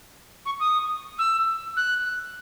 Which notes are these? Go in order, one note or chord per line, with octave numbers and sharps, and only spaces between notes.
C#6
D#6
E6
F#6